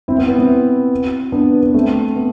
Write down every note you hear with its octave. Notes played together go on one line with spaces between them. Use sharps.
C4 E4
B3
B3
C4 E4
B3 D4
B3
A3 C4
B3